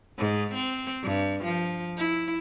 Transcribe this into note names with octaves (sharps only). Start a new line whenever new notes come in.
G#2
C4
G2
F3
E4